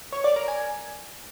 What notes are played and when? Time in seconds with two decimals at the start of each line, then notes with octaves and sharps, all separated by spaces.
0.12 C#5
0.24 D5
0.36 A#4
0.48 G#5